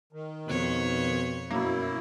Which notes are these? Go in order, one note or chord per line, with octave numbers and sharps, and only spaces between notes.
D#3
F2 B2 C#5
F#2 B2 A#3 E4